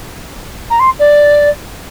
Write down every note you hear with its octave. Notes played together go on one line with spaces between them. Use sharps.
A#5
C6
D5